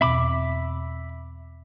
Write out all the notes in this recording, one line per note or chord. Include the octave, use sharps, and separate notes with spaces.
E2 B2 C4 E5 B5 D6